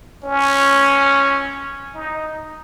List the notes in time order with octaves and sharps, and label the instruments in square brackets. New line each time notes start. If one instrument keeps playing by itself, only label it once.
[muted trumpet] C#4
D#4